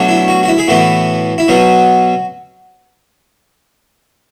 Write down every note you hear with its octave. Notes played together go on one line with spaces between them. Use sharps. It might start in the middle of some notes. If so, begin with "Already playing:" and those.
Already playing: B2 F#3 A3 D4
E4
F#4
F#4
E4
G#4
A2 E3 B3 E4 F#4
E4
B2 F#3 B3 F#4